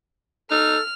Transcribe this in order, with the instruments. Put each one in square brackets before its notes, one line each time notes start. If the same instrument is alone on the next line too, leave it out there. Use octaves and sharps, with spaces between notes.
[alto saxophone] D#4 [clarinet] A4 [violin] F6